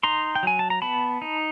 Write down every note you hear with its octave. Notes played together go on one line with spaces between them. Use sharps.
D#4 A#5 C6
G5
F#3 G#5
A5
A#5
B3 A5 B5
D#4